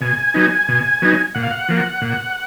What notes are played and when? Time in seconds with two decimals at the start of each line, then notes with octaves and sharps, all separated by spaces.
0.01 B2 G#5
0.34 F#3 B3 D#4
0.68 B2
1.02 F#3 B3 D#4
1.35 A#2 F#5
1.43 F5
1.51 F#5
1.69 F3 A#3
2.02 A#2